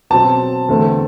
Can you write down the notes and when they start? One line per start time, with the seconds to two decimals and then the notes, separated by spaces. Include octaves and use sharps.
0.10 B2 F#3 C4 A5
0.69 E2 D3 A3 C4